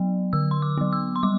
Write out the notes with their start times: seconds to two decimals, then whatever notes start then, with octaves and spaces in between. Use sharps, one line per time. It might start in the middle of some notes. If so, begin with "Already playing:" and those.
Already playing: F#3 B3
0.33 D3 E6
0.51 C6
0.62 D6
0.77 F#3 B3
0.93 E6
1.16 C6
1.23 G3 D6